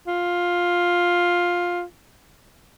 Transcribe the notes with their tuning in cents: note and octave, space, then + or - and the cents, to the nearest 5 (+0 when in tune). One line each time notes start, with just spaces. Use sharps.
F4 +10